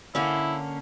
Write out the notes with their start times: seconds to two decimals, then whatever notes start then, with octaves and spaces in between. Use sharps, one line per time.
0.15 D3 A#3 C#4 E4